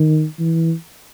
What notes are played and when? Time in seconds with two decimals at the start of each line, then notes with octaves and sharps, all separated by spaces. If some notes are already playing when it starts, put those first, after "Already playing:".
Already playing: D#3
0.39 E3